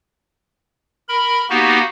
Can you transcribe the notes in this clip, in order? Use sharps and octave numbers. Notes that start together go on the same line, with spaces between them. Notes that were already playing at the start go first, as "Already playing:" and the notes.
A#4 B5
A#3 B3 D#4 F#4 G4